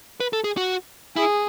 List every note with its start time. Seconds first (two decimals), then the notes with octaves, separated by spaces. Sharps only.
0.20 B4
0.33 A4
0.44 G#4
0.57 F#4
1.16 E4 G#4